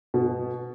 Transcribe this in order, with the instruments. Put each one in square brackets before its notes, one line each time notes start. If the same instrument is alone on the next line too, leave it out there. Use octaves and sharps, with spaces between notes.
[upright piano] B2